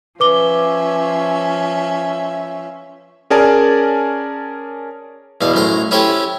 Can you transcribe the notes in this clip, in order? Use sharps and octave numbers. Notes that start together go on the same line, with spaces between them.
F3 C#4 B4 E5 D6 G7
C#4 G#4 A#4 D5 G#5 A5
E2 B2 F5
F#2 A2 C5 A#5
C#4 E4 G4 A4 C5 C#5